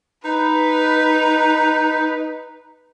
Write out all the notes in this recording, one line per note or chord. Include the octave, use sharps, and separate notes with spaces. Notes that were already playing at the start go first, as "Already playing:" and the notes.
D#4 B4